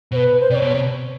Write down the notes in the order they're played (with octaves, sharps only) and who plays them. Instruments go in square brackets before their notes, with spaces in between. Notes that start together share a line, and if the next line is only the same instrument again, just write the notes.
[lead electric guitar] B2 [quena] C5
[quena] B4
C5
[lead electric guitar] C3 [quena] D5
[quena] C#5
[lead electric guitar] B2
C3